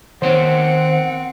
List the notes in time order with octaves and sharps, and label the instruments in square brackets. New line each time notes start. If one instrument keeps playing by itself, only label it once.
[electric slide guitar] D#3 C#5 [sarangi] C4 [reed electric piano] C5 [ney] F#5